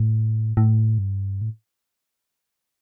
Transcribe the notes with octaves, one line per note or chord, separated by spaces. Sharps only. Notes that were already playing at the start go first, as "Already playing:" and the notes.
Already playing: A2
A2
G2
A2